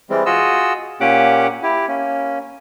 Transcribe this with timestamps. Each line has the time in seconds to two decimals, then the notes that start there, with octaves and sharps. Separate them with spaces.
0.10 E3 G3 G#3 C4
0.26 F4 F#4 G#4 D#5 E6
1.01 A#2 A#3 C#4 G4 F#5 D6
1.63 E4 G4
1.88 A#3 C#4